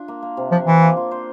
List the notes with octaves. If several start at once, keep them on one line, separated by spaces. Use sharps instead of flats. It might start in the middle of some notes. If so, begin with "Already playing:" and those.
Already playing: D4 F4
A#3
A#3
C3
F3 D4
E3 F4
A#3
F4
C5